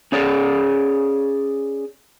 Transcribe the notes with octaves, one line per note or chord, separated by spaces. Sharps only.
C#4 G#4 C#5 D5